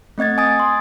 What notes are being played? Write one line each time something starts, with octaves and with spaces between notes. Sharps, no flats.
A3 C4 D#5 G#6 A6
G#5 D#6 A6
C6